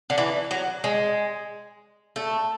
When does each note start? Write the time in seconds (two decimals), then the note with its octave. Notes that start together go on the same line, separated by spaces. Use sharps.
0.10 D3
0.18 E3
0.51 F#3
0.84 G#3
2.16 A3